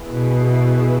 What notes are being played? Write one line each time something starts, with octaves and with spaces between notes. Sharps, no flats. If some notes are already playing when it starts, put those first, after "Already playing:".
Already playing: B3 E4 G#4 B4
B2